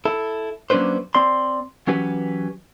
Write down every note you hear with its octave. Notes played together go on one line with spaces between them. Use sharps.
E4 A4
F#3 A#3 C#4 D4 B4 C5
C4 D5 C6
E3 F#3 C#4 G4 B4